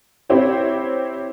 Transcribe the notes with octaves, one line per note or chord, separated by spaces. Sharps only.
C4 E4 G4 C#5